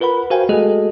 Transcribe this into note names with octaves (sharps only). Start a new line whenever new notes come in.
F4 A#4 B4 F#5 B5
F#4 A#4 C5 F5 G5 G#5
G#3 A3 F#4 G#4 A4 D#5